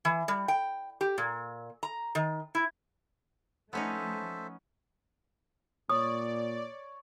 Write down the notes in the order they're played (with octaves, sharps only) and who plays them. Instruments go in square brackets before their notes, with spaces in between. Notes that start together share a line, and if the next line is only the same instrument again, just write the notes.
[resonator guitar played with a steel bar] E3
G3
G5
G4
A#2
A#5
D#3
E4
[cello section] F3 A3 [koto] B3 C#4 D#4 [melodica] A4 C5 E5
[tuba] A#2 [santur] C#5 [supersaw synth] D5 [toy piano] D#6